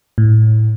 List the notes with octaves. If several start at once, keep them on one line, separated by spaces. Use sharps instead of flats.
A2